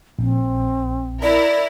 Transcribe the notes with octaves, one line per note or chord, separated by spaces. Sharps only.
A#1 C4
E4 A#4 D5